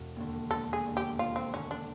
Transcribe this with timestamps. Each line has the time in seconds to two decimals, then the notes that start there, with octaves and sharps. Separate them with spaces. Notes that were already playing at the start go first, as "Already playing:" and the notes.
Already playing: E1
0.16 D#2 D3
0.51 E1 A4
0.73 G#4
0.85 D#2 D3
0.97 G4
1.18 E1 F4
1.36 C4
1.53 D#2 D3 C#4
1.71 D4